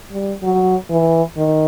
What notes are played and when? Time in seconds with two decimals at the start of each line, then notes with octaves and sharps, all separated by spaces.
0.12 G3
0.43 F#3
0.90 E3
1.37 D#3